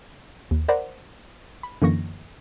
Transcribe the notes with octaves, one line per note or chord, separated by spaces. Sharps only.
D#2
A#4 C5 D5 F#5 A#5 B5
B5
F#2 D3 E3 A#3 C#6 A#6